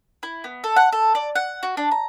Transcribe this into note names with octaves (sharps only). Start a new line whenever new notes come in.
E4
B3
A4
F#5
A4
D5
F#5
F#4
D4
A#5